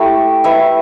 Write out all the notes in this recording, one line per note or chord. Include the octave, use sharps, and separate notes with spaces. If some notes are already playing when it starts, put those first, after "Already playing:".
Already playing: A3 E4 G4
E4 B4 E5